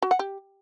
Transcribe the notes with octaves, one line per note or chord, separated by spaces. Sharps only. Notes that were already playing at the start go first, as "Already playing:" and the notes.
F#4
F#5
G4